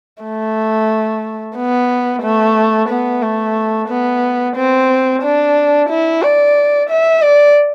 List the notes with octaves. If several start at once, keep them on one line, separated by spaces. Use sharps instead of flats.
A3
B3
A3
B3
A3
B3
C4
D4
E4
D5
E5
D5